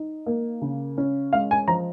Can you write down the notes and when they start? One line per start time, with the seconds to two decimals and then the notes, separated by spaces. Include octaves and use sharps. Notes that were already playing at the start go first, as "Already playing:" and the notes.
Already playing: D#4
0.26 A#3
0.62 C#3
0.98 C#4
1.33 G#3 F5
1.51 G#5
1.68 F3 A#5